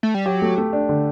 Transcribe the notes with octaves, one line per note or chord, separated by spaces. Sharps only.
A3
G3
F#3 G4
A3
A3
D4
D3